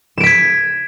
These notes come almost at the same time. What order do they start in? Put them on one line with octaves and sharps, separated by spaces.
E7 D7 B6 G#6